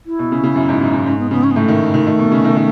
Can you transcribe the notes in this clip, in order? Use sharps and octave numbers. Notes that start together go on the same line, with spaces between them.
E4
B2
C#3
C#3
F#2
G#2
F#2
G#2
G#2 C#4
B3
C#3 B3
C#4
B3
A2 A3
D#3
D#3
D#3
B2
C#3
D#3
D#3